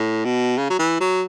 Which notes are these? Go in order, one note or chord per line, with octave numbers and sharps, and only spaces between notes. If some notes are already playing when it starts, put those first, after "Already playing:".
Already playing: A2
B2
C#3
F#3
E3
F#3